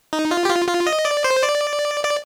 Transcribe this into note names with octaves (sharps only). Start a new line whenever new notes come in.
D#4
F4
G4
F4
F4
D#5
D5
C5
D5
D5